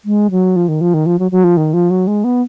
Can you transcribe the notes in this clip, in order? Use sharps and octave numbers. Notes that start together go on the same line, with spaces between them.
G#3
F#3
F3
D#3
F3
D#3
F3
F#3
F#3
F3
D#3
F3
F#3
G#3
B3